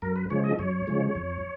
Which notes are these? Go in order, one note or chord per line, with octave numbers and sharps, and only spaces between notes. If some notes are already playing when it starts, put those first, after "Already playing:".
F#2 A#4
B4
C#3 F3 G#3 C#5
D#5
F#2 C#5
C#3 F3 G#3
F2